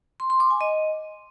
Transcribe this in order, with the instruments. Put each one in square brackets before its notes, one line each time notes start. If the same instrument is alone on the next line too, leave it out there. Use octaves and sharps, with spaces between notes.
[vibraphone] C6
C6
D6
G#5
D#5